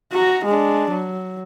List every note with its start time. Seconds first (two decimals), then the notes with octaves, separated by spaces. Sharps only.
0.13 F#4 A#5
0.45 G#3 D4
0.91 F#3